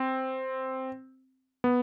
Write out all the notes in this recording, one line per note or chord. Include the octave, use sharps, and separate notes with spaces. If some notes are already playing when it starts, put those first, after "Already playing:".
Already playing: C4
B3